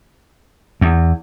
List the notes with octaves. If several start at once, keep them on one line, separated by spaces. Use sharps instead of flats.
E2